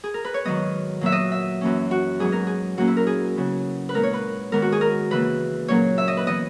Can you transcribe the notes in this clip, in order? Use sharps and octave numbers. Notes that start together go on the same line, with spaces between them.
G#4
A#4
B4
C#5
G#2 D#3 F#3 B3 D#5
A#2 F#3 B3 E5
D#5
E5
F#2 E3 A#3 C#4
F#4
G#2 F#3 B3 G#4
A#4
G#4
A#2 F#3 A#3 C#4 F#4
E4
A#4
G#4
C#3 F#3 B3
B4
A#2 G#3 B3 A#4
C#5
B4
G#2 D#3 G#3 B3 A#4
F#4
G#4
A#4
C#3 E3 A#3 B4
A#2 F#3 A#3 C#4 C#5
E5
D#5
B4
E3 B3 D#5